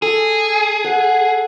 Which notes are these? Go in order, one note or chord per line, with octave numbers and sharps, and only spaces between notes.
G#4 A4
F#5